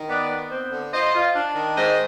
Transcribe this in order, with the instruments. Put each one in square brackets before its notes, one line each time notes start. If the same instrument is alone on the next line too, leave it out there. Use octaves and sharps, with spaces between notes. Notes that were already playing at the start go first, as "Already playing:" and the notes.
Already playing: [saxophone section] D#3
B3 B4 D5
B3
C4
D3
F4 C5 D#5
F4
D4
D#3
G#2 C5 D#5